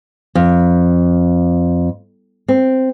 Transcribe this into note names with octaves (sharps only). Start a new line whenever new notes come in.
F2
C4